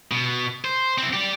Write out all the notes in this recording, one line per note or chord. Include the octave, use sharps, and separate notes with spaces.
B2
C5
C4 E4
G4 D5